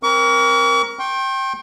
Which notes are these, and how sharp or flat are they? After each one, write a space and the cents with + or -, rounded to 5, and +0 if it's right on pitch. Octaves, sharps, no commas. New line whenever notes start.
C4 +20 A#4 +15 C#6 +45
G5 -5 C6 +45